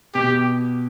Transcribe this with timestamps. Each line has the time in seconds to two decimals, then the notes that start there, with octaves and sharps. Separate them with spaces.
0.15 B2 G4